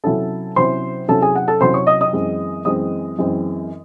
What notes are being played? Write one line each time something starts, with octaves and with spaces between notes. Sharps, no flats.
C3 F#3 C#4 E4 A4 A5
C3 F#3 C#4 E4 C5 C6
C3 F#3 C#4 E4 A4 A5
G#4 G#5
F#5
A4 A5
C3 F#3 C#4 E4 C5 C6
C#5 C#6
D#5 D#6
D#5 D#6
F#2 E3 G#3 C4
F#2 E3 G#3 C4 D#5 D#6
F#2 E3 G#3 C4